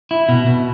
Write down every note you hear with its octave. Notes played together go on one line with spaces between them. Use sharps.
E4
B2
B2